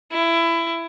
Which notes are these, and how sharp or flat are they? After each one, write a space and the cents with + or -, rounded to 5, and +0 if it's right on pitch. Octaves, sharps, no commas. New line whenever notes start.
E4 +20